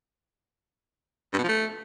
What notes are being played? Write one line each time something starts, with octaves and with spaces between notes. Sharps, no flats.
G2
B2
F3
A3